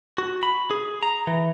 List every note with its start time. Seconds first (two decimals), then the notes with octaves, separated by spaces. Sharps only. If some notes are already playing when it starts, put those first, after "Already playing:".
0.18 F#4
0.43 B5
0.71 G#4
1.03 A#5
1.27 E3